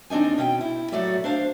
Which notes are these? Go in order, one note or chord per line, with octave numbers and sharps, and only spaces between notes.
D#2 C4 D4 D#4 G#5
B2 C#4 F5 G5
E4
A2 F#3 A3 F#4 D5 E5
D4 C5 F5